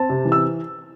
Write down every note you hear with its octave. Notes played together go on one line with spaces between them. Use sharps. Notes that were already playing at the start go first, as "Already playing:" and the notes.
Already playing: C4 A5
C3
E3
E6